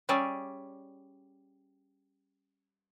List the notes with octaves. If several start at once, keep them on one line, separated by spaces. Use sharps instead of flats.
G3 C#4 G#4 D5 E5